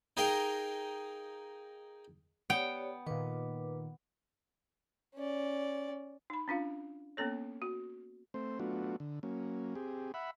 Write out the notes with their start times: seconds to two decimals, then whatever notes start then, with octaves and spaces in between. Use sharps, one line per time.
0.17 D#4 G#4 A#4 D#5 F5 G5
2.50 B3 G4 C#5 D5 G5
3.07 A#2 D#3 B4 D6
5.15 C#4 D5
6.30 D#4 B5
6.48 C#4 D4 F4 F5
7.17 A#3 B3 C#4 A4 C#5
7.62 F#4
8.34 A3 C4 C5
8.59 F#3 A3 B3 D4 F4 F#4
9.00 D3
9.23 F#3 A#3 C#4
9.75 C4 G4 G#4
10.14 E5 F#5 B5